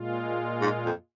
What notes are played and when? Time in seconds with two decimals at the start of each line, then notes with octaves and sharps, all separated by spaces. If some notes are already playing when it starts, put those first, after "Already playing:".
Already playing: A#2 G#3 F4
0.61 G#2
0.85 F2